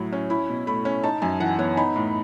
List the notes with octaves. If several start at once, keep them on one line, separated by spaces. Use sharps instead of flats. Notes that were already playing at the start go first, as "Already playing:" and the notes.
Already playing: A2 F#3 E4
C#4
E4 B5
B2
A3 B5
C#4
D#4 A5
F#2 G#5
E3 F#5
B3 C#5
D#4 B5
A2